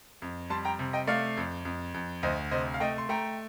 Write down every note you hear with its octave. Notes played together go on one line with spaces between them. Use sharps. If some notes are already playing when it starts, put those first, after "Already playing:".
F2
G3 A5 C6
G5 A#5
C3
D#5 G5
A3 D5 F5
F2
F2
F2
D2 C5 D#5
C3 C5 D#5
F5
A3 D#5 G5
C6
A3 G5 A#5